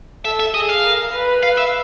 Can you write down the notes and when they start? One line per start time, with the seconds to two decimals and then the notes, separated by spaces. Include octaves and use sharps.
0.25 A4 E5
0.40 E5
0.54 G#4 D#5
0.69 F5
0.84 A#4
1.13 B4
1.43 F5
1.58 E5